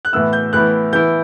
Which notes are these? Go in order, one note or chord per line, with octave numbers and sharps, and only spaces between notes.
F#6
A2 E3 B3 E4 E6
G6
A2 E3 B3 E4 F#6
E3 B3 E4 G6